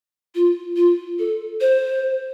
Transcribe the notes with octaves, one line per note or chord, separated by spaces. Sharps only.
F4
F4
A4
C5